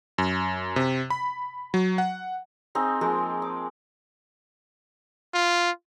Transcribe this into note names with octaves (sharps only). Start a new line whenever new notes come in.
F#2
C3
B5
F#3
F#5
C4 D#4 G#4
F3 G#3 A#3 G#4
D6
F4